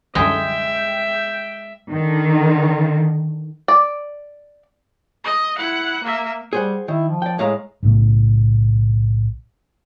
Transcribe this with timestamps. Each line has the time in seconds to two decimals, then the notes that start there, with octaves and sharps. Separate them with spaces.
0.15 C2 F#2 D3 G#3 E5 G5
1.92 D3 D#3
3.68 D5
5.24 D#5
5.58 E4 F#5
6.03 A#3 E5
6.53 G3 G#4 C5 F#5
6.88 D#3 E4
7.08 F3
7.22 D5 G5
7.39 A2 G#3 F5 A#5
7.83 B1 A2 C#3 A3